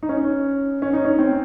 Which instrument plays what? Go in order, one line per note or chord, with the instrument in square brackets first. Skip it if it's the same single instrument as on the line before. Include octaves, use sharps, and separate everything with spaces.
[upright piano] D#4
C#4
C#4
D#4
C#4
C4